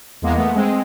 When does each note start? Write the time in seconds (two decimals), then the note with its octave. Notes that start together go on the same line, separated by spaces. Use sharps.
0.22 E2 G#3 A#3 B3
0.37 A3 B3
0.54 G#3 C4